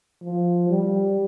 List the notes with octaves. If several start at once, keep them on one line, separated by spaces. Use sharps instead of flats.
F3
G3